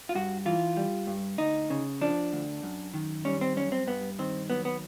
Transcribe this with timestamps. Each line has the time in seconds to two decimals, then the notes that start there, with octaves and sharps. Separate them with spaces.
0.09 F4
0.15 G2 F#4
0.45 E3 F4
0.77 G3
1.07 G2
1.38 D2 D#4
1.70 C#3
2.01 F3 D4
2.33 D2
2.63 F#2
2.94 D#3
3.25 G3 C#4
3.41 C4
3.56 F#2 C#4
3.72 C4
3.87 G2 B3
4.19 D#3 C4
4.50 F#3 B3
4.65 B3